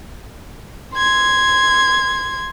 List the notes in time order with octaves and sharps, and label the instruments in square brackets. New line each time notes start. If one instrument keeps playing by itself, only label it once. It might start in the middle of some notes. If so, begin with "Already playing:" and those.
[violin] C6 G#6